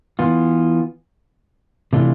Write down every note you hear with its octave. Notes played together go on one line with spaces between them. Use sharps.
E3 B3 F4
C3 E3 A3 D4 F4